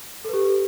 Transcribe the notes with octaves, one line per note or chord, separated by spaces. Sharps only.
G4 A4 B4